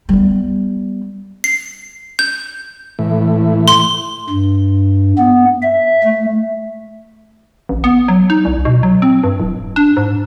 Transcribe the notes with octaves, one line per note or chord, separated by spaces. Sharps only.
G3 B3
C7
G6
A2 E3
C6
G2
B3
E5
A3
A1
B3
F#3
D#4
C2
B2
F#3
C4
G2
D1
D4
G#2